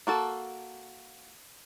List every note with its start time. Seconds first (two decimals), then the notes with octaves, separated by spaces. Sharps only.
0.07 A#3 F#4 A4